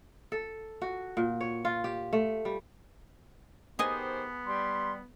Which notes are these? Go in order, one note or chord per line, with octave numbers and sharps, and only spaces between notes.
A4
F#4
A#2
C#5
F4
G4
A3
G3
D#3 B3 G4 G#4 C5 D#5 G#5
G3 C6